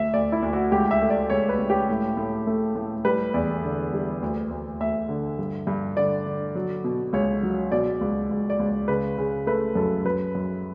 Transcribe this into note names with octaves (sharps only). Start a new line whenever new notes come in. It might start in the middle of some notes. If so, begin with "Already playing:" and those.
Already playing: D2 A3 E5
D2 D5
E4
D2
F#4
C#2 G4
E5
A3
D5
C#2 C#5
B4
C#2
G4
A2
A2
A3
A2
G3 B4
E2 D5
D3
G3
D2
D2
D2 E5
D3
G2
G2
D3 D5
D3
F#3
B2
C#2 C#5
F#3
B2 D5
C#2
C#2
D5
C#2
C#3 B4
C#3
A3 B4
F#2 A4
F#2 B4
F#2